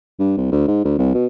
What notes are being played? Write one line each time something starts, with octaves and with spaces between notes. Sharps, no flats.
G2
C2
D2
G#2
D2
C2
B2